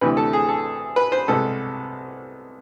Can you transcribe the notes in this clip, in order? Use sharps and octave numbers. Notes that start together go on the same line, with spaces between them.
D2 C3 E3 B4
A4
G#4
A4
B4
C5
C2 B2 G#3 B3 A4